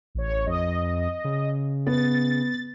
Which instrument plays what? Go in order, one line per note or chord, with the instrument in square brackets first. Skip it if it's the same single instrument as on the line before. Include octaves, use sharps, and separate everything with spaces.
[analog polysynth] A1 C#5
[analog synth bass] F2 [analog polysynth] D#5
[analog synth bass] C#3
[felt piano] B3 [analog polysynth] A6